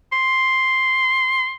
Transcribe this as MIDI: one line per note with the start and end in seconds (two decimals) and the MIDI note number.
0.12 1.55 84